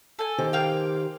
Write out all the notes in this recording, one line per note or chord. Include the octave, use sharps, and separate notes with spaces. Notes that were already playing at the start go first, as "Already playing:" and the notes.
A4 G#5
D#3 G4 C5
A#3 F5 G5